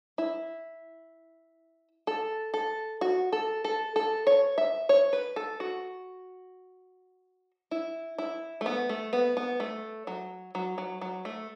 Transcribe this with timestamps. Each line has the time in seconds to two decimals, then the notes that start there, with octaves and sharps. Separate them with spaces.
0.18 E4
2.07 A4
2.54 A4
3.01 F#4
3.32 A4
3.65 A4
3.96 A4
4.27 C#5
4.58 E5
4.89 C#5
5.13 B4
5.36 A4
5.60 F#4
7.71 E4
8.18 E4
8.61 A3
8.66 B3
8.89 A3
9.13 B3
9.37 B3
9.60 A3
10.07 F#3
10.55 F#3
10.78 F#3
11.01 F#3
11.25 A3